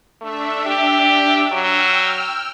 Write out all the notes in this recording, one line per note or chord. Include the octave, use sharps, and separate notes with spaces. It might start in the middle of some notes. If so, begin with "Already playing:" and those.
A3 D4 E5
G4
F#3 G5 E6 F6